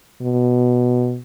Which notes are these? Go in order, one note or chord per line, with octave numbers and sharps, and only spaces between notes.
B2